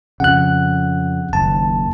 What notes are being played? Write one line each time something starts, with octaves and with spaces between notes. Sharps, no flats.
F2 C#3 F#5 F#6
F#1 D#2 A5